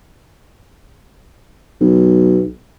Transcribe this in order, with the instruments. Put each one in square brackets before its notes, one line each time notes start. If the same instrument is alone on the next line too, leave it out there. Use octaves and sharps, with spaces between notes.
[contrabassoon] B1